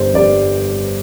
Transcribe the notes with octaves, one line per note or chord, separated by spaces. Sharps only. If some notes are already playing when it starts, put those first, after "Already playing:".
Already playing: G1 G2 G3 C5
G1 G2 G3 D5